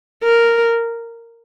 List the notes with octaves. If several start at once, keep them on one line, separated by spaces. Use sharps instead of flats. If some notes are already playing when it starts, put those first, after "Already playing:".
A#4